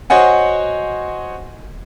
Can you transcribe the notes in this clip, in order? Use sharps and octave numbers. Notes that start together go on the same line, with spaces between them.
F#4 C5 C#5 D#5 F#5 G#5